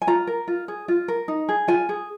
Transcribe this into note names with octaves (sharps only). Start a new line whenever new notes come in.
G#5
F4 A#5
A#4
F4
G#4
F4
A#4
D#4
G#4
F4 G#5
G#4